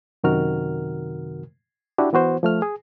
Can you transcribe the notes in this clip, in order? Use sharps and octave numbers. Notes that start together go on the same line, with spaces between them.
F#2 C3 D#3 F#4 A#4 F6
D4 E4 F#4 G4
E3 B3 F#4 C5
F3 A3 F6
G#4